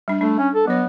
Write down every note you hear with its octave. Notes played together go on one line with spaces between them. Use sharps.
G3 D4
A3 D4
C#4
A4
F#3 B3 C#5